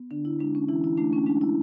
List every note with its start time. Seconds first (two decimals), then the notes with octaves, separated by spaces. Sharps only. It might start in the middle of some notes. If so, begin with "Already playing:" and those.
Already playing: B3
0.11 D3 D4
0.25 E4
0.39 G#3 D4
0.55 C#4
0.69 E3 E4
0.84 E4
0.98 A3 D4
1.13 C#4
1.26 G#3 D4
1.41 E4